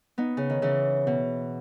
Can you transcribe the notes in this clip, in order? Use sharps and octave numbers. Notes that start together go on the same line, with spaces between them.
B3 D#4
C#3
D#3
C#3 E3
B2